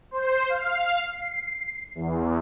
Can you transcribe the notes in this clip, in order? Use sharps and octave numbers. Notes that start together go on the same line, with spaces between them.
C5
F5
C7
E2